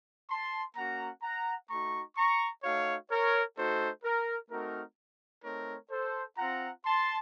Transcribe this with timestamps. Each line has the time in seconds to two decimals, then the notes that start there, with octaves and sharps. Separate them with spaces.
0.29 A5 C6
0.76 A#3 C#4 F#4 F#5 A#5
1.22 F#5 A#5
1.70 A3 D#4 F#4 A#5 C#6
2.16 A#5 C#6
2.63 A3 D#4 F#4 C#5 F5
3.10 A#4 C#5
3.57 A3 D#4 F#4 A4 C5
4.04 A#4
4.50 A3 C4 D#4 F#4 A#4
5.43 A3 C4 D#4 A#4 C#5
5.90 A4 C5
6.37 C4 F4 F#5 A#5
6.84 A5 C6